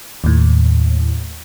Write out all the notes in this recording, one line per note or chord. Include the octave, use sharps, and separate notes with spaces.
D#2 A2